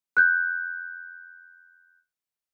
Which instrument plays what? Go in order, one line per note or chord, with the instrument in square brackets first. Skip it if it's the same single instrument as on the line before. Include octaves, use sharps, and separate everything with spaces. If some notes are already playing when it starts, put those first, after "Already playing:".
[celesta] F#6 G6